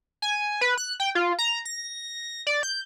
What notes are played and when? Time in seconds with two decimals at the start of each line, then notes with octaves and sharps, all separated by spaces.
0.22 G#5
0.61 B4
0.78 F#6
1.00 G5
1.15 F4
1.39 A#5
1.65 A#6
2.47 D5
2.63 G6